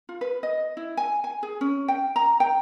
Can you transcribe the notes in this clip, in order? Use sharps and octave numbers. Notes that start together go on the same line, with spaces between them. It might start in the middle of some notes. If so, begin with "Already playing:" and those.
F4
B4
D#5
E4
G#5
G#5
G#4
C#4
G5
A#5
G5